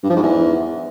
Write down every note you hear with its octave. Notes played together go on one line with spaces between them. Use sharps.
G2
F3
G#2
E2